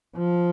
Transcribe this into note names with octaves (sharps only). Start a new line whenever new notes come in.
F3